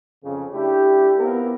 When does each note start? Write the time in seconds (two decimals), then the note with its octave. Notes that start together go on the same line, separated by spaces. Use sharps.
0.24 F2 C#3
0.54 A3 D4 E4 G4
1.19 B3 C4 E4 F4 G4 A#4